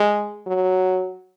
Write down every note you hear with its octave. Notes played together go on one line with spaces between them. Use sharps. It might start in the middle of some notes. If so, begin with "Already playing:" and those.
Already playing: G#3
F#3